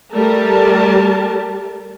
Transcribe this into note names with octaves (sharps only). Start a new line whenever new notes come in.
G3 A3 G4 A#4 A5